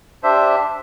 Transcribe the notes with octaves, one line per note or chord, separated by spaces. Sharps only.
D4 G4 C5 E5